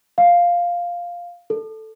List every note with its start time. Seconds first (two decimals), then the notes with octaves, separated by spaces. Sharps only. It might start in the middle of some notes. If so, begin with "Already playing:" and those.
0.18 F5
1.50 A4